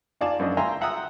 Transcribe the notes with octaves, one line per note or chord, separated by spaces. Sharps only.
D#4 F4 D5 G#5 A5
F#2 F3 D4 D#5
E5 F5 G5 G#5 A#5 C6
E5 F#5 G5 A#5 D#6 E6